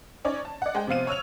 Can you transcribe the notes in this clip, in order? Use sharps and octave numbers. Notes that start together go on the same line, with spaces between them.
C#4 D#4 C#5 D5
A5
D5 F#5
G#3 G5
C3 F3 B3 F5 D#7
C#5 E6 F6 F7